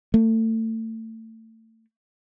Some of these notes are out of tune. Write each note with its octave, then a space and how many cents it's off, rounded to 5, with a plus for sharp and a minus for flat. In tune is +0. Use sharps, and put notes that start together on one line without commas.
A3 +30